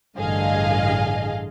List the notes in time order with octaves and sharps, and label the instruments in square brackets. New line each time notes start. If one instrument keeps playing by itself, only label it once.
[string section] A1 G2 D3 G#4 D#5 F5